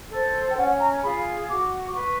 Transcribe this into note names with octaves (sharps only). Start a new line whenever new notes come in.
A4 C5
G5
C#4 F#5
A#5
F4 G#4 B5
F#4 D6
D6
B4 C#6